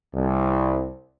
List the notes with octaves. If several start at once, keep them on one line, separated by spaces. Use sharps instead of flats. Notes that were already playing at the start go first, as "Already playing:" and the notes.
C2